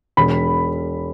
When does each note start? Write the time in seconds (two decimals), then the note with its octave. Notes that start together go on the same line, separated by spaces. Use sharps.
0.17 E1 B5